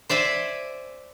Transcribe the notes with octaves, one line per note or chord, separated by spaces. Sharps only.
C5 D5 E5 G#5